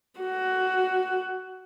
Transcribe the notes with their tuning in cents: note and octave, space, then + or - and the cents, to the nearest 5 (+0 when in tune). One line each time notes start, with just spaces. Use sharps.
F#4 +15